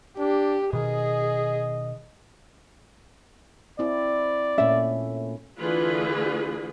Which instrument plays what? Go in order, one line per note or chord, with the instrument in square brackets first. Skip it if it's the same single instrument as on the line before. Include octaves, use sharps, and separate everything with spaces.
[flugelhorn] D4 [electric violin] G4
[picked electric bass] B2 D#3 [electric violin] G#4 [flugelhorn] D#5
[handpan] C4 E4 [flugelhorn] D5
[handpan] A#2 A3 C#4 [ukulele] E5
[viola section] D3 E3 A3 F4 G#4 B4